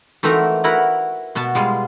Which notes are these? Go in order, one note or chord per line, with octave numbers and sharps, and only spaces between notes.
E3 A3 C4 D#4 F#4 A#4
E4 F#4 A#4 B4 F#5
B2 B3 F#4 A5
G3 G#3 F4